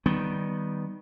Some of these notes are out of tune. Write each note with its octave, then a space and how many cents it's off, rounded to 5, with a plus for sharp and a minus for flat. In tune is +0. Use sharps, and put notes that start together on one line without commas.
D#3 +0 G3 -5 B3 +0